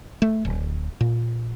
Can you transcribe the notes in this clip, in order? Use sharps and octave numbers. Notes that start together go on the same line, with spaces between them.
A3
D1
A#2